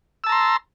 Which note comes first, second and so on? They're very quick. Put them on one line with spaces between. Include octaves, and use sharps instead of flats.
E6 A5 A#5 C6